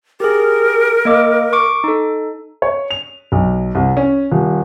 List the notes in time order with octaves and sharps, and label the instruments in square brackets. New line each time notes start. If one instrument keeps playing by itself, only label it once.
[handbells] G4 G#4 [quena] A#4
[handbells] A#3 D#5 D6
C#6 D6 D7
D#4 A4
[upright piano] C#5
F7
B1
C2
C#4
D#1